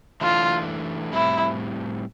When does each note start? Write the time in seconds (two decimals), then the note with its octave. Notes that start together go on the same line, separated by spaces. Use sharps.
0.21 E3 A3 D4 F4
1.13 A2 G3 C4 E4